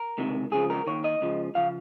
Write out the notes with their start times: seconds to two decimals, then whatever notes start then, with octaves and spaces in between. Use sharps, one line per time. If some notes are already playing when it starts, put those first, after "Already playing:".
Already playing: A#4
0.18 C#2 C3 D#3
0.51 C#2 C#3 F3 G#4
0.70 A#4
0.87 D#2 D#3 C#5
1.04 D#5
1.21 C#2 C#3 F3
1.55 C#3 F3 F5